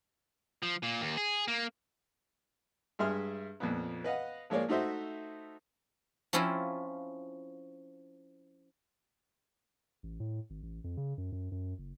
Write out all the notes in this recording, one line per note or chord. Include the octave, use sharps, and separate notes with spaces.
F3
A#2
D#2
G#4
A#3
G2 G#3 G#4 E5 C6 F6
F2 A#2 B3
B4 D#5 F5 F#5
F3 G#3 A#3 C#5 D5
A3 D#4 F#4 C5 E5
F3 C4 C#4 E4 F4
A1
A2
G#1
A1
F2
C#3
F#2
F#2
F#2
F#1